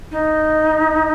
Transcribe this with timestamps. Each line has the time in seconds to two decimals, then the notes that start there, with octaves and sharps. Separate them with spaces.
0.11 D#4